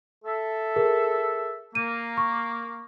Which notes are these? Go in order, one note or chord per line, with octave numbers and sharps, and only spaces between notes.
A4 E5
G#4 A#4
A#3 D#7
C#6